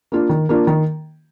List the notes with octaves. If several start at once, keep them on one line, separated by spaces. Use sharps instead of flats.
A#3 D4 F4
D#3
A#3 D4 F4
D#3